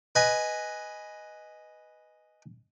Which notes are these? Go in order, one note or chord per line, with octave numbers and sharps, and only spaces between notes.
B4 D#5 G#5